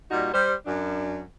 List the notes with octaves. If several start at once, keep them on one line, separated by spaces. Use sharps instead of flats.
A#2 G3 D#4 F#4
G3 C5
F#2 D4